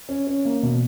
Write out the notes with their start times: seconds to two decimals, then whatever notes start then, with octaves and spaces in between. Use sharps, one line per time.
0.09 C#4
0.27 C#4
0.45 A#3
0.63 B2